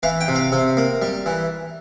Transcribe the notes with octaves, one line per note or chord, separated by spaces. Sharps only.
E3 F5
G5
C3
F5
C3
A#3
G3
E3